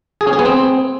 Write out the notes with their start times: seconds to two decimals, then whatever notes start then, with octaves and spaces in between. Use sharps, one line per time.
0.21 G#4
0.27 C#4
0.33 G#4
0.39 B3
0.45 C4